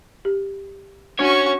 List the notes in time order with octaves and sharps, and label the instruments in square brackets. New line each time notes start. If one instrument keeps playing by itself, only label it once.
[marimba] G4
[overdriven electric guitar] C#4 C#5 [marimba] D4 [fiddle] F#4 C#6